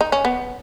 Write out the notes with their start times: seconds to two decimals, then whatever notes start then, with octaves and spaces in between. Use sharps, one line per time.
0.01 D#4
0.12 C#4
0.25 B3